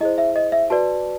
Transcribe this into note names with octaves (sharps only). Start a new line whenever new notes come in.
E4 G#4 C5 D#5
E5
D#5
E5
F#4 B4 D5 A5